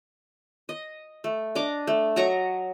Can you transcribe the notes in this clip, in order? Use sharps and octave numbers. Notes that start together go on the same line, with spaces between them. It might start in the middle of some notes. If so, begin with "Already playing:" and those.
D#5
A3
D4 D#5 A#5 D6
A3
F#3 D#5 A#5 C#6